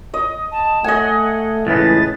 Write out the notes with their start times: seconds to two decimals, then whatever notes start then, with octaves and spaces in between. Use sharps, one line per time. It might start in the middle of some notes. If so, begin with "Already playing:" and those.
0.14 D#5
0.52 A5
0.84 A3 D#5 F#5 G#5
1.67 C#2 A2 E3 B3 A6